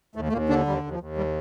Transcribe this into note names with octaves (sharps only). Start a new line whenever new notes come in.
D#2 A2 A3
A3
D#2 A#2 A#3
D3 D4
D#2 G3
D#2
F3
D#2
G3